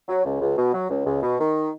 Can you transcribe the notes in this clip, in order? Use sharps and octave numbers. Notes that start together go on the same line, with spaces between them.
F#3
C#2
C#2
B2
F#3
C#2
C#2
B2
D#3